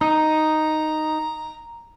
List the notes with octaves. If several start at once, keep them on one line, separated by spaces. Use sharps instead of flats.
D#4 A#5